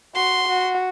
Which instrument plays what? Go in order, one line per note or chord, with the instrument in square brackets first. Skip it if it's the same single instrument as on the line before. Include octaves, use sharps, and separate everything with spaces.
[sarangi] F#4 [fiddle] C6
[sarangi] F#4